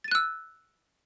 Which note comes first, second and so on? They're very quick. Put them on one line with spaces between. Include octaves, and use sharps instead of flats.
A6 D#7 F#6 E6